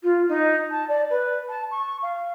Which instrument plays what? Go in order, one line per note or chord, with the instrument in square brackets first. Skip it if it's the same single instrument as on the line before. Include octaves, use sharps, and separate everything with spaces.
[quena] F4
D#4
A5
D5
B4
A5
C#6
F5